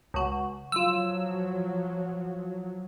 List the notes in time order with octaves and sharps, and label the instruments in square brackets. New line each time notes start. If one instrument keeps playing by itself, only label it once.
[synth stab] C#2 F#4
[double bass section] F3 F#3 [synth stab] F4 E6